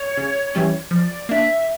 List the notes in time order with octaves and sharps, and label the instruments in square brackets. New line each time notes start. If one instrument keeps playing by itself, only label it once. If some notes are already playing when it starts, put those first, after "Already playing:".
Already playing: [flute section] C#5
[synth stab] C#3
E3 G3 C#4
[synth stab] F3 [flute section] D5
[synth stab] A#3 D4 [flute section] E5